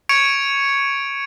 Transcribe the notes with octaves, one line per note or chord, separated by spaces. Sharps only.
C#6 G#6 C#7 D7 F7